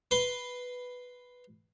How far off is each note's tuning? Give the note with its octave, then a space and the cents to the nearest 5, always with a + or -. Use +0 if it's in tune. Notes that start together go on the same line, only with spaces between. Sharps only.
B4 +0 C6 +0